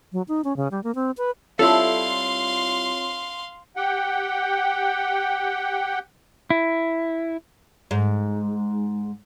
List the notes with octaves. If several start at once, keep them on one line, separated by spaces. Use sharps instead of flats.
F#3
D#4
C#4
C#3
G3
A#3
C4
B4
G3 C4 E4 F4 A4 C#5 F5 C6
G4 F#5 G5
E4
G#2